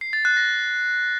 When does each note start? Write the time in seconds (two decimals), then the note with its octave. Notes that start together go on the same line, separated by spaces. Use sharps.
0.01 C7
0.13 A6
0.25 F#6
0.37 A#6